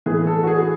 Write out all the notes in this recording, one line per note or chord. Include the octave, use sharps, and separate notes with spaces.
A2 E3 G#4
A4
F#4
G#4